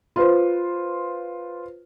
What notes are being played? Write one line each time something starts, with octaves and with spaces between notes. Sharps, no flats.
F4 B4 C5